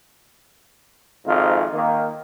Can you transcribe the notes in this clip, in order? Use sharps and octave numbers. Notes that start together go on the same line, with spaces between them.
G#1 F2 G#2 F4
D#3 A#3